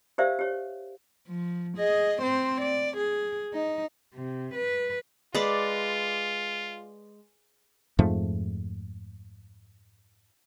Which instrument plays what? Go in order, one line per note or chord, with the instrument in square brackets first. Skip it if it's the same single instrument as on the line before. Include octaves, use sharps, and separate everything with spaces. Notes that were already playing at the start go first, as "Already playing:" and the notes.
[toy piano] G4 A#4 C5 D5 E5 F5
G4 C#5
[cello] F3
G#4 D#5
C4 C5
D5
G#4
D#4
[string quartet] C3
B4
[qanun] G#3 B4 D5 [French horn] F4
[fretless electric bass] F2 G#2 F3 A3